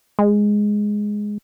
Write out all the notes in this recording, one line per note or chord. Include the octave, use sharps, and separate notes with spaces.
G#3